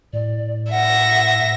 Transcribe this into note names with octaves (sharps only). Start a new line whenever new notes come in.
A2 D5
E5 F#5 A#6